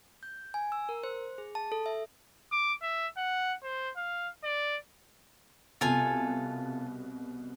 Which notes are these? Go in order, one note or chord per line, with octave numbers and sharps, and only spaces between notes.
G6
G#5
E6
A#4
C5
G#4
A5
A4
E5
D6
E5
F#5
C5
F5
D5
C2 B2 F4 A4 G#5